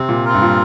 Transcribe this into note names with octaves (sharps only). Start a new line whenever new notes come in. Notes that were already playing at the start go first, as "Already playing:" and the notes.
Already playing: C3 C4
A#2
C4 F4 A#4
G2
A#2